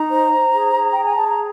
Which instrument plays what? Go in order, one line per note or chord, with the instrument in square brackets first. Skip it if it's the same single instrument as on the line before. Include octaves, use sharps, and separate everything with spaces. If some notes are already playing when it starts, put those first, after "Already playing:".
Already playing: [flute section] D#4 A#5
C5
C5
G#4
G#4
G#4 G5
G#5
G#4 A5
A#5